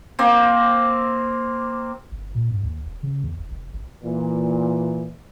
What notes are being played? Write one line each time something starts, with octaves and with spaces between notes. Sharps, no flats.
A#3 C4
G1
A#2
G2
D#2
E1
C#3
E2
F1
F1
G1
A#2 E3